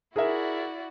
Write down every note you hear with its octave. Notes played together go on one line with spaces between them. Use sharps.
E4 F#4 G#4 A#4 D5 E5